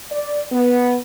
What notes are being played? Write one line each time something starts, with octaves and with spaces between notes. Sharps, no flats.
D5
B3